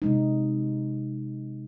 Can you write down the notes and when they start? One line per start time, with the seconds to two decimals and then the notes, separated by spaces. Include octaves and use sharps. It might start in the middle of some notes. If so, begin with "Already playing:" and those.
0.02 C3 G#3 D#4